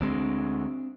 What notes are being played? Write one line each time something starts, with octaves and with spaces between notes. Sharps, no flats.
D2 G#3 C4 D4